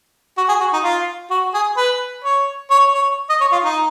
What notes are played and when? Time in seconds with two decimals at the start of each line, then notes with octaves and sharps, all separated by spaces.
0.37 F#4
0.49 G#4
0.60 F#4
0.73 D#4
0.84 F4
1.31 F#4
1.54 G#4
1.77 B4
2.24 C#5
2.71 C#5
2.94 C#5
3.30 D#5
3.41 C#5
3.52 F4
3.65 D#4